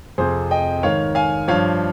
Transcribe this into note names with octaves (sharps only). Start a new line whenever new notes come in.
F2 C3 F3 G#4 C5
D#5 G5
G#2 D#3 C#5 F5
F5 G#5
G2 F3 C#5 F5